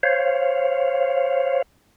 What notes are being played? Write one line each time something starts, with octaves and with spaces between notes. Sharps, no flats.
C5 C#5 F5